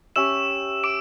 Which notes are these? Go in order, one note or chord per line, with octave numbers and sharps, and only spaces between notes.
C#4 G4 C#5 E5 E6 E7
D6 D7